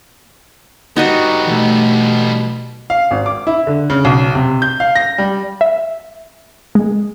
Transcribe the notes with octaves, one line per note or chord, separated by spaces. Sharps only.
G3 B3 D#4 F#4 D#5
B2 E3 A3
F5
G#1
D6
E4
D3
C#3
B1
C3
G6
F5
A#6
G3
E5
G#3